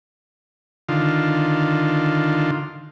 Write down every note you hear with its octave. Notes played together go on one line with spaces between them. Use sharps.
D3 D#3 F4